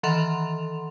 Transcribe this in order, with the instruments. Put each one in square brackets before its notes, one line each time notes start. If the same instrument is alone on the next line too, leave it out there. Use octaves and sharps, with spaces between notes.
[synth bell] D#3 E3 A4 F#5 C6 F7